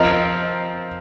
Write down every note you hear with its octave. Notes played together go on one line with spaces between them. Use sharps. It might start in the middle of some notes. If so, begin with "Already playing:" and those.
Already playing: F3 C4 F4 A#4 D#5